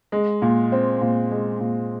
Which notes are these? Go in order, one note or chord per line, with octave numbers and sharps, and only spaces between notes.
G#3
A#2
C4
A#2
G#3
A#2